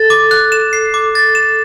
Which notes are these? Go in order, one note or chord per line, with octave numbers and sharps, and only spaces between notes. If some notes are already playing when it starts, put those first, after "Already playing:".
Already playing: A4 A6
D6
F#6
E7
C7
D6
A6
E7